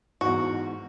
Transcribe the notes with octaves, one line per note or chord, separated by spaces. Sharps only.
E2 G#2 F#4